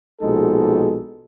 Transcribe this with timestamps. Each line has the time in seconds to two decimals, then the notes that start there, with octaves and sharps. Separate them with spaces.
0.21 A#1 B2 G#3 D#4 A4